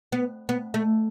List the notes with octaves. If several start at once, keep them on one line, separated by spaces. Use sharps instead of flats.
B3
B3
A3